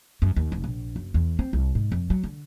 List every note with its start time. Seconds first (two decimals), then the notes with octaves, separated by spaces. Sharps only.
0.22 F#2
0.36 D#2
0.52 F1
0.64 A#1
0.96 F#1
1.14 E2
1.39 C4
1.53 C2
1.75 G#2
1.92 F2
2.10 F#3
2.24 D3